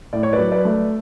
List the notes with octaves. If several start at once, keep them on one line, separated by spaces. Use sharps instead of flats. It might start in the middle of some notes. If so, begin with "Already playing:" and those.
A2 D5
C#5
B4 D5
F#3
B4 D5
A3